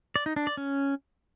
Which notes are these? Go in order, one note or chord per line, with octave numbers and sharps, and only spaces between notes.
D5
D#4
D4
D5
C#4